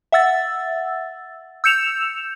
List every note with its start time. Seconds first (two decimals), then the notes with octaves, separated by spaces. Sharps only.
0.12 E5 F#5 E6 A6
1.64 E6 G6 C#7 E7 F7